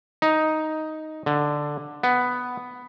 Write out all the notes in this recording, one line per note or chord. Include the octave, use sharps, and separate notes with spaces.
D#4
D3
B3